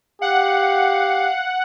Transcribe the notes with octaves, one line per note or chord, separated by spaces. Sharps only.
G4 F5 F#5